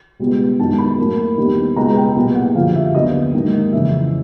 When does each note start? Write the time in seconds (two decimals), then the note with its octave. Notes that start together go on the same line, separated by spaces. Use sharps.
0.20 C#2 B2 G3 B3
0.59 F#2 D#3 G#3 B3 A5
0.78 B5
0.98 A2 F#3 A#3
1.38 D#2 D#3 G3 B3
1.76 C#2 B2 G#3 B3 A#5
1.97 G5
2.16 C2 A#2 F#3 B3
2.36 F#5
2.55 F#2 D3 F3 F5
2.75 E5
2.95 D#2 D3 F#3 B3 D#5
3.34 G#2 D#3 F#3 A#3
3.73 F2 C#3 E3 E5